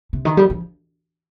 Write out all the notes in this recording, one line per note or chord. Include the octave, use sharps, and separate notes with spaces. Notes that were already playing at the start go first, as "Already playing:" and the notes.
C3
D#3
G3
F3